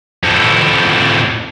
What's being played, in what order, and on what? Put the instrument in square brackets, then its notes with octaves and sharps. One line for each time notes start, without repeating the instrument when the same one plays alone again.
[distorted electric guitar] F2 A2